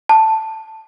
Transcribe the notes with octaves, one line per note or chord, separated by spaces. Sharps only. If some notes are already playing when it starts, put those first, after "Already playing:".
A5